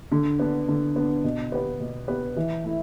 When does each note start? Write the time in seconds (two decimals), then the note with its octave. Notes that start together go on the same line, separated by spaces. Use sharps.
0.12 D3
0.40 B3 D4
0.68 D3
0.96 B3 D4
1.24 B2
1.52 B3 G4 B4
1.80 B2
2.08 B3 G4 B4
2.36 E3
2.64 A3 E4